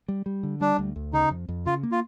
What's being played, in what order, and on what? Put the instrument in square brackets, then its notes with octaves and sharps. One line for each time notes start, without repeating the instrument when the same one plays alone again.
[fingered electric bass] G3
G3
D3
[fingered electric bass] G3 [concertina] D4
[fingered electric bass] D2
D2
[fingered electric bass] C#3 [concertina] D#4
[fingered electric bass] F2
F2
[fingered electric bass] C#3 [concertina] F4
[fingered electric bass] A#3
[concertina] F4